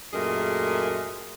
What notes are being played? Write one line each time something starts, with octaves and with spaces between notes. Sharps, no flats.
F#2 A#2 A3 G#4 A#4 D#5